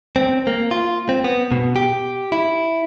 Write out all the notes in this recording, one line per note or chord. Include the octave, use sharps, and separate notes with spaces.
C4
A#3
F4
C4
B3
B2
G4
E4